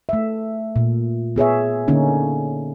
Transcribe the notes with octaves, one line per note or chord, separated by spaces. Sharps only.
A3 E5
A#2
B3 G#4 C#5 E5
D3 A#3 C#4 D#4